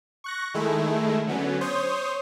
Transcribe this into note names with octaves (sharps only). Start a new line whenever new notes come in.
C#6 F#6 A#6
D#3 G#3 A3 E4
D3 F#3 B3 C#4
C5 C#5 C6 D#6 G6